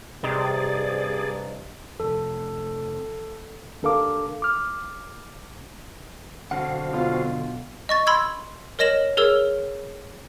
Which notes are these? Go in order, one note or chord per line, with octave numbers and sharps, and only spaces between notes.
G2 C3 D#4 G#4 D5
F2 C3 A4
D#2 D4 A4 A#4 F5 D6
D6 F6
B1 D3 F3 C4 F#4 F5 F#5
B2 F4
D#5 C#6 A6
B5 C6 E6 G#6
A#4 C#5 D#5 A#6 E7 F#7
G#4 A#4 C#5 E6